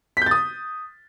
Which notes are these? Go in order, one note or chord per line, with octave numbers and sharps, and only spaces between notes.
D#6 G6 A6 B6